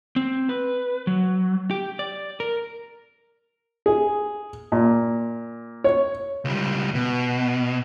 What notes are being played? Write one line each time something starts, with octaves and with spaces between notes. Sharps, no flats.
C4
B4
F#3
G4
D5
A#4
G#4
A#2
C#5
C#2 G3
B2